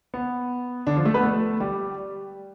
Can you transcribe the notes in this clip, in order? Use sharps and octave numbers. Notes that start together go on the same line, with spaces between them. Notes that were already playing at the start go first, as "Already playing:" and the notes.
B3
D3 D4
F3 F4
A3 A4
B3 B4
A3 A4
G3 G4